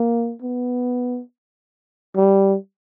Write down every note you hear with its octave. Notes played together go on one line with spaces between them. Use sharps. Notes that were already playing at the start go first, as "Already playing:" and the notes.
Already playing: A#3
B3
G3